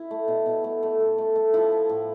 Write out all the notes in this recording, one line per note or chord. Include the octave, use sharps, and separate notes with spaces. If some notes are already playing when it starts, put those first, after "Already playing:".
Already playing: E4
A3
B2
B2
A3
A3
A3
A3
A3
F3 E4
A3
A2